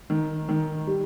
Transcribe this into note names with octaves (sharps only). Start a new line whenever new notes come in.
D#3
D#3
G3